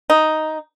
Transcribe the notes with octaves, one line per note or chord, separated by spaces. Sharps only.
D#4